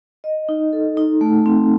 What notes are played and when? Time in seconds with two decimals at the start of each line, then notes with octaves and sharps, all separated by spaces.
0.24 D#5
0.49 D#4
0.73 A4
0.97 D#4
1.21 A3
1.46 C4